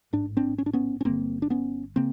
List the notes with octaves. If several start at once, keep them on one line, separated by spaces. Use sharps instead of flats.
A1 G#2 D4
C4 D4
C#4
D4
B3 C#4
C#4
G1 G2 D3 A#3 C4
D4
B3 C#4
C#3 A#3 C4